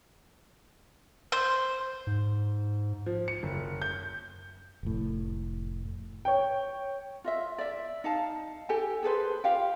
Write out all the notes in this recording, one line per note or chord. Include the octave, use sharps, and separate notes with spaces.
C5
G#2
F3
C#7
F#1
G6
F1 A2
C#5 G5
F4 D#5 E5
D5 E5
D#4 F5 A5
G4 A4 G5 G#5
G#4 A4 B4 C5
F4 G4 F5 G5